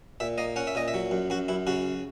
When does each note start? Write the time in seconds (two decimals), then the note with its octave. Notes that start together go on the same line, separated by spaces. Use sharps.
0.20 A#2 E5
0.38 A#3 D#5
0.56 C#4 F#5
0.67 E5
0.75 A#2 D#5
0.88 E5
0.94 F#3
1.11 F#2
1.30 F#2 F#4
1.48 F#2 E4
1.67 C#3 F#4